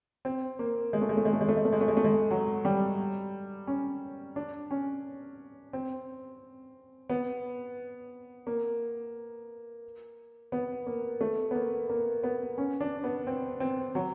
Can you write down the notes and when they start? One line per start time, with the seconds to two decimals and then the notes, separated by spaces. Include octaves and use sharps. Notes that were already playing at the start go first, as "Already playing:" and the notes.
0.25 C4
0.59 A#3
0.93 G#3
1.01 A3
1.09 G#3
1.17 A3
1.25 G#3
1.33 A3
1.41 G#3
1.49 A3
1.57 G#3
1.65 A3
1.73 G#3
1.81 A3
1.88 G#3
1.97 A3
2.04 G#3
2.31 F#3
2.65 G3
3.67 C#4
4.36 D4
4.71 C#4
5.73 C4
7.10 B3
8.47 A#3
10.52 B3
10.87 A#3
11.21 A3
11.51 B3
11.55 A#3
11.89 A#3
12.23 B3
12.58 C#4
12.81 D4
13.04 B3
13.27 C4
13.60 C4
13.95 F#3